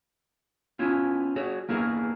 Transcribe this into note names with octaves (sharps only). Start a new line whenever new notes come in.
B3 C#4 E4 F4
F#4 G#4 C#5
A#3 B3 E4 G#4 A#4